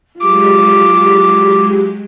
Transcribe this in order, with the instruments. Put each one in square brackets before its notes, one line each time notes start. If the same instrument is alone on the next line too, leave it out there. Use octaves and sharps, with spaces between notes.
[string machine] F#3 G#3 G4 [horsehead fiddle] F4 [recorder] D6